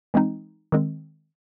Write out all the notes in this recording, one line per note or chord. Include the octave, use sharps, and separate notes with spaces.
E3 G#3 C4 D#4
D#3 G#3 C4